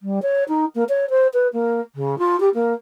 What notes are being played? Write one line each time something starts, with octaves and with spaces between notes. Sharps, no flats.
G3
C#5
D#4
A#3
C#5
C5
B4
A#3
C#3
F4
G4
A#3